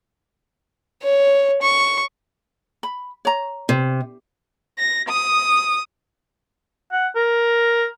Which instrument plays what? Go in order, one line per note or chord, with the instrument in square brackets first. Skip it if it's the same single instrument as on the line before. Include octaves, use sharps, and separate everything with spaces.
[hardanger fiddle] C#5
C#6
[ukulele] B5
C#5 A#5
[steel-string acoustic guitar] C3
[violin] A#6
D#6
[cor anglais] F#5
A#4